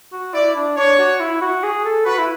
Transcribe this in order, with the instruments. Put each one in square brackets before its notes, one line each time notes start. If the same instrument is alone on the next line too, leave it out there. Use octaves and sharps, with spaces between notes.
[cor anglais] F#4
[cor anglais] E4 [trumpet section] D5
[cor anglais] D4
[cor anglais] D4 [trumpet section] C#5
[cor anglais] F#4
E4
F#4
G#4
A4
[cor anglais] F#4 [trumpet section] B4
[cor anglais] E4